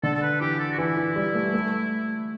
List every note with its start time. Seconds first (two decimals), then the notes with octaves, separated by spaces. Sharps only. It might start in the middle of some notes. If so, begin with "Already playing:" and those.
0.03 D3 A4
0.14 A4
0.22 B4
0.40 E3 G4
0.60 A4
0.72 F#4
0.78 E3 E4
0.97 E3
1.16 G3
1.35 A3
1.54 A3